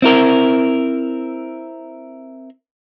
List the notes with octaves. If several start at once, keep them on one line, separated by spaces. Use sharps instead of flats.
C4 E4 A#4